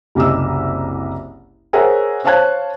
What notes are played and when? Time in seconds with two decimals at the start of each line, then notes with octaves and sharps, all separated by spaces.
0.15 F#1 C2 G4 D#5 E6
1.73 G#4 A#4 C5 C#5 E5 F#5
2.25 C5 C#5 F5 A5 F#6 G#6